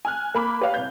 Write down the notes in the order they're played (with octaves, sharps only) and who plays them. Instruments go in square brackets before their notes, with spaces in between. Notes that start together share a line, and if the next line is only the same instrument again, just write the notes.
[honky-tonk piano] G#5 F6 F#6
A#3 B5 D6
G4 B4 C#5 D5 F5
C2 G6